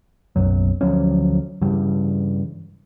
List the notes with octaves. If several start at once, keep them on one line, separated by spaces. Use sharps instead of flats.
F#1 B1 F#2 F#3
D2 F3 F#3 C#4
G2 C#3 E3 G3